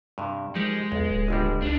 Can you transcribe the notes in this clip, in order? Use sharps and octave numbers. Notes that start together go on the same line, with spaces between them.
G2 C3
F3 G#3 D#4 G4 A#4
B1 E2
D1
G1 C#2 G3
C#2 D4 D#4